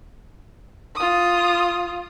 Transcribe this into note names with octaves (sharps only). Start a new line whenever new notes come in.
F4 D#6